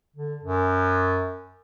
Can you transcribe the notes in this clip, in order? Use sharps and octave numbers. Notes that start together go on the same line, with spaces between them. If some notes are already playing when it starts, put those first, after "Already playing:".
D3
F#2